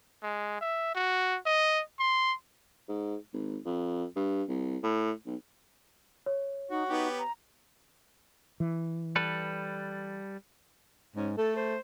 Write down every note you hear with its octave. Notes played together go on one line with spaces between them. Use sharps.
G#3
E5
F#4
D#5
C6
G#2
G#1
F2
G2
C2
A2
B1
C#5
D#4 F#4
B3 D#4 G4
A#5
E3
G3 A4 B4
G#2 C#4
A3 A4
C5